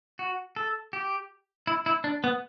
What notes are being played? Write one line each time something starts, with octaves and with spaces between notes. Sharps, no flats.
F#4
A4
G4
E4
E4
D4
B3